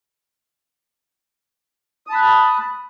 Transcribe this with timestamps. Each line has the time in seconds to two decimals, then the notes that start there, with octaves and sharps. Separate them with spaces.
2.07 D#6
2.10 A5
2.13 B5
2.15 F#6